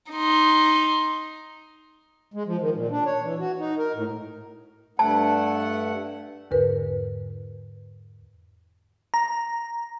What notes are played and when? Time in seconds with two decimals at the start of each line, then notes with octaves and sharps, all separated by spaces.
0.12 D#4 C6
2.34 G#3
2.46 F3
2.60 D#3
2.75 A#2
2.91 D4
3.06 C#5
3.22 E3
3.39 F#4
3.59 D#4
3.78 A#4
3.95 A2
4.99 G2 A3 F#5 A5
6.51 E2 G#2 D3 A#4 B4
9.14 A#5